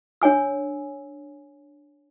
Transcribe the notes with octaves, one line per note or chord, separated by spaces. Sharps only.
D4 C#5 G#5 E6